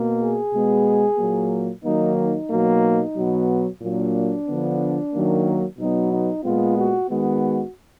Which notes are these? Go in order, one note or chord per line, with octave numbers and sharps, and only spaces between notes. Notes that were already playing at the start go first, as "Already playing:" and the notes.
Already playing: B2 A#3
G#4
B2 G#3 B3
A#2 F#3 A#3
D#3 F#3 A#3 D#4
D#4
B2 F#3 A#3
B2 F#3 B3
A#2 F#3 A#3 D4
D3 F3 B3
D#3 F#3 A#3
B2 F#3 B3 D#4
D#4
A#2 G#3 B3 F4
F#4
D#3 G#3 B3 F#4